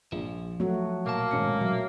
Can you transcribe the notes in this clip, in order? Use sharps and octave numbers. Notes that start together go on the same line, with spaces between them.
A#1 F3
F#3 A3 F#4
B1 A#2 A#3 A5
G#1 C#4 C#7
F#3 E5